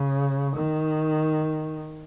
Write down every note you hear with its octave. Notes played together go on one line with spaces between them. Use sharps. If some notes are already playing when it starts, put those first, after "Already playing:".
Already playing: C#3
D#3